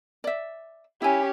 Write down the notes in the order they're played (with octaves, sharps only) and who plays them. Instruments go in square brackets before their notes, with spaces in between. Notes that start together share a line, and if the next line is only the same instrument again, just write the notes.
[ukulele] D5 E5
[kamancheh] C#4 G4 [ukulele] E4 G#5